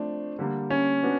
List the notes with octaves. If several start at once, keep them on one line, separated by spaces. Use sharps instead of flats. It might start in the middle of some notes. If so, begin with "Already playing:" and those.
Already playing: F3 A3 C4 D4
D3 G3 A#3
C#4
B3 D4 F#4